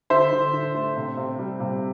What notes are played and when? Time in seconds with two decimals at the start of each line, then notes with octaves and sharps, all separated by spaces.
0.10 D3 C5 E5
0.32 D3
0.53 D3
0.75 A3
0.96 C3
1.17 C3
1.39 G3
1.60 C3